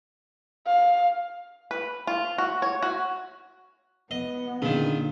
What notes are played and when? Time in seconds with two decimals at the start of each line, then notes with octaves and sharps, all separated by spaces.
0.67 F5
1.71 B4
2.07 F4
2.38 F#4
2.62 C#5
2.82 F#4
4.11 B3 D#5
4.62 A#2 D3 D#3 C#4 D4 G#4